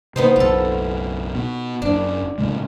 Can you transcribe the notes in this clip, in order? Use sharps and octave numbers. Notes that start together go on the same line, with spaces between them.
C3 A#3 B3 D#4 C5
F#1 B1 F4 A4
B2
F#1 F#2 D4
A2 C#3 G#3